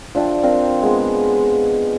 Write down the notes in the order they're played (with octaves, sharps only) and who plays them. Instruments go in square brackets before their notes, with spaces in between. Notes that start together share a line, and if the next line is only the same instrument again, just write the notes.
[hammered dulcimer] F3 D4 E5 G5
C4 D4 A#4 F5
G#3 B3